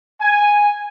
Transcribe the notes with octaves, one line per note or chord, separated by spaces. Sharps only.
G#5